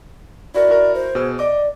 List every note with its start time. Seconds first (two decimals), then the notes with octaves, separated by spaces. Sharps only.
0.54 E4 F#4 A#4 D5
0.69 E4 F#4 A#4
0.94 C5
1.15 B2 G#4 E6
1.39 D5 D#5 D6